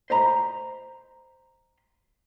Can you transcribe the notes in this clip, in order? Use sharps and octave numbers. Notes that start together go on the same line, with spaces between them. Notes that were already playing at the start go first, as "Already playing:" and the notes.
C5 D#5 A#5 B5